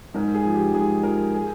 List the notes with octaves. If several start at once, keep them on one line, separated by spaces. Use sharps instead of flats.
G#2 A#4
G#4
F3
G4
G#2 G#4
F3 A#4
G#4